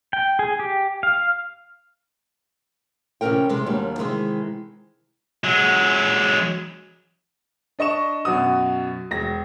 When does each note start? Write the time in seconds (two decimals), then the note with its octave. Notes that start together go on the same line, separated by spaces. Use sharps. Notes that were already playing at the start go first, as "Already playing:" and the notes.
0.13 G5
0.39 G#4
0.59 G4
1.03 F5
3.21 C3 E3 F3 C#4 A#4 G5
3.49 C3 G#3
3.66 D#2 F#3 G3 A#3 D4
3.98 C3 D#3 E3 G#3 E4 G#4
5.44 F#3 G#3
7.79 D4 D#5 C#6 E7
8.25 F#2 B2 F#4 D#6
9.11 E1 A#6